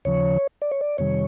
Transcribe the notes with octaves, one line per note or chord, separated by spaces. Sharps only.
D#2 C#3 F3 C#5
D5
C#5
D5
F2 C3 D#3 G3 C#5